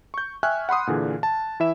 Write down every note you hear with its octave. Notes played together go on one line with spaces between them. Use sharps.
C#6 G6
E5 G5 G#5 C#6 F6 F#6
F#5 B5 C6 D#6
A#2 D3 E3 G#4
A5
E3 E4 E5 E7